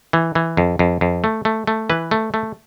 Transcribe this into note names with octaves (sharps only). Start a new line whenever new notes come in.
E3
E3
F2
F2
F2
A3
A3
A3
E3 B4
A3
A3